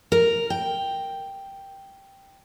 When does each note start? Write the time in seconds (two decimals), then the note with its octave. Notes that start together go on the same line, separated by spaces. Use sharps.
0.12 A#4
0.50 G5